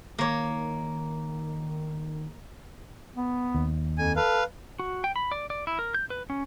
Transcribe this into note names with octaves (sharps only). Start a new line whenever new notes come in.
D#3 A#3 C#5
B3
D#2
F2 G#5
A4 B4 F5
F#4
G5
B5
D5
D5
E4
A#4
G6
B4
C#4